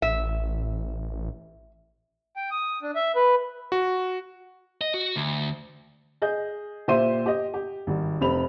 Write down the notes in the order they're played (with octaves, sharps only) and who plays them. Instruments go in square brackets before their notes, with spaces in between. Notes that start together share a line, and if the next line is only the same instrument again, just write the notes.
[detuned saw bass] A1 [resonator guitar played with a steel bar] E5
[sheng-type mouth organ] G5
D#6
D4
E5
B4
[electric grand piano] F#4
[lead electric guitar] D#5
F#4
D2
[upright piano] G#4 D#5 G6
A#2 G4 C5 E5 C6 D#7
G4 D#5
G4
G#1 G3
F1 C3 C4 B5 F7